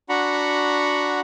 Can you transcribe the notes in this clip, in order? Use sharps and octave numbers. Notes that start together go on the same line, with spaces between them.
D4 F#4 F#5 A#5 B5 C#6